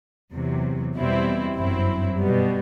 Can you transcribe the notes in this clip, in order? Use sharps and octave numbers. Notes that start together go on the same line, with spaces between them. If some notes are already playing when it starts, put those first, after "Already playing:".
E2 C3 F#3
E2 B2 G3 C4 E4
G1 F#2 F#3 C4 E4
B2 G3 B3